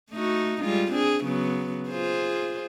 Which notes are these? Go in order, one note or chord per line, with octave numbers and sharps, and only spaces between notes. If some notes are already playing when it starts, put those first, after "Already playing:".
A3 D#4 F#4
G3 G#3 F4
C4 D4 G#4
C#3 F#3 B3
F4 G#4 C5